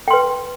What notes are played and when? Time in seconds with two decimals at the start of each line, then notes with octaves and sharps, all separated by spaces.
0.08 G5
0.11 C6
0.13 B4